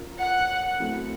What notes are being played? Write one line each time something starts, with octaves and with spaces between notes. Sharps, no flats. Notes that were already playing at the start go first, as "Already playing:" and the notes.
Already playing: C#4 F4 A#4
F#5
F#3 A3 C4 E4